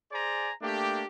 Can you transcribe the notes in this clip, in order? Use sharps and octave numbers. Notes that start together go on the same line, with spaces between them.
G#4 C5 D5 G#5 A#5
A3 A#3 D4 G4